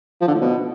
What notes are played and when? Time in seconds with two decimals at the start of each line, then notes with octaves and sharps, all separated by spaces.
0.21 F3
0.28 D3
0.34 A2
0.41 B2